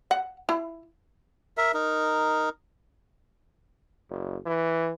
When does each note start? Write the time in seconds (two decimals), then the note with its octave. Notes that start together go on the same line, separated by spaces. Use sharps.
0.11 F#5
0.49 E4
1.58 A#4 E5
1.74 D#4 A#4
4.10 F#1
4.46 E3